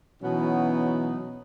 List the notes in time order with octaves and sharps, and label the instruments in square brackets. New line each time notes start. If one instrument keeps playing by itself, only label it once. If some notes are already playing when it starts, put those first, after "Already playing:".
[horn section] B2 E3 F#3 B3 C#4 D#4